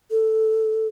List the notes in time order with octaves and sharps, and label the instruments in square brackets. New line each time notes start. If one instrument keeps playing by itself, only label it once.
[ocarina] A4